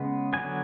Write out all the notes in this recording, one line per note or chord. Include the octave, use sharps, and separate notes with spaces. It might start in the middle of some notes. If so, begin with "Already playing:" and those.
Already playing: C#3 G#3 B3 F#5
D3 F#3 B3 G#5